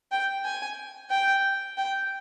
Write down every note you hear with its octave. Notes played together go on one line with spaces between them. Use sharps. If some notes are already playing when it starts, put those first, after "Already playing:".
G5
G#5
G5
G5